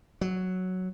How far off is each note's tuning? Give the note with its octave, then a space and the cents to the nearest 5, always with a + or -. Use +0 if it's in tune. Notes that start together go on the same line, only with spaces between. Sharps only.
F#3 +0